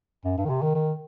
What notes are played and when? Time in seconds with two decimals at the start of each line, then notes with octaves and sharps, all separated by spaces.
0.25 F#2
0.38 G2
0.45 D#3
0.50 C3
0.62 D#3
0.75 D#3